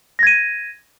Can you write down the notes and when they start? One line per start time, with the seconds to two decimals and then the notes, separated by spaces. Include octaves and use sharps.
0.19 A#6
0.23 G#6
0.27 D#7